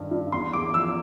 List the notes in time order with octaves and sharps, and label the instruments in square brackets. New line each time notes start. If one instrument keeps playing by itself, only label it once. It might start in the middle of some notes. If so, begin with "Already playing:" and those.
Already playing: [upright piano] G2 D#3
G2
E2 C6
E2 D6
F3 E6